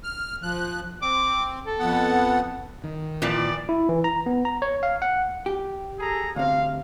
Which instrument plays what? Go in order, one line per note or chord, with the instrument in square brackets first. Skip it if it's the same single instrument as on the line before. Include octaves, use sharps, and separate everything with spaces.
[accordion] F6
F3 F#6
[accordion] C4 [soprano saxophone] D6
[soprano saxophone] A4
[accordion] F2 B3 F#5
[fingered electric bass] D#3
[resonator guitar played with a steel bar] A#2 E3 F3 [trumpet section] D5
[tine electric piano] E4
E3
A#5
B3
A#5
C#5
F5
F#5
[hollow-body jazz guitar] G4
[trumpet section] G#4 A4 A#5
[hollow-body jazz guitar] D2 C3 [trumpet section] F5